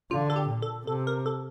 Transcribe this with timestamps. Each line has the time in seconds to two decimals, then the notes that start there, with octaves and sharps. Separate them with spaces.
0.11 D3 F4
0.30 A4
0.36 G4
0.49 A#2
0.62 A4
0.87 C3 A4
1.07 A#4
1.26 A4